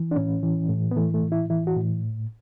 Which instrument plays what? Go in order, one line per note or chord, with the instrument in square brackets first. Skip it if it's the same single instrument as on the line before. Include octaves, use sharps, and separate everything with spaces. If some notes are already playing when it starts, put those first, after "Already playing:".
Already playing: [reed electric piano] E3
D4
A2 C#4
E3
A2
B3
E3 A3
A3
A2
E4
E3 E4
F#4
A2